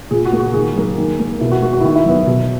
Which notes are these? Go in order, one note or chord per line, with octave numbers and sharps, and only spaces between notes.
A#2 G#4
F#4
A#3
F#4
D#3 G#4
F#3 A#3
D#3
A#3
B2 E4
F#4
A#3 F#4
F#4
E4
D#3
E4
F#3 B3
B2